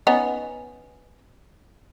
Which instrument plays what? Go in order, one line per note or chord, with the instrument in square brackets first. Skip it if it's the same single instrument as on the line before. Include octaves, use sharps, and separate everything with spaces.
[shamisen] B3 C#4 D#4